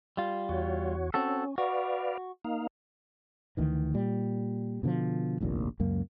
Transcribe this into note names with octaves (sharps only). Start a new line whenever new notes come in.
G3 F4
E2 F#4 C#5
C4 C#4 F#4 A4
F#4 B4 D5 F5
A#3 D#4 F5
D2 D#3 E3
A#2 G3
B2 D3 E3 F3
F1 A#1 D#2 A#2
C#2 F#2 A#3